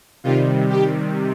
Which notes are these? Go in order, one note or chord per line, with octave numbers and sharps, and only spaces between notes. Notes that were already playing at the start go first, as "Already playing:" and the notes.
C3 D#3 G3 F4
G4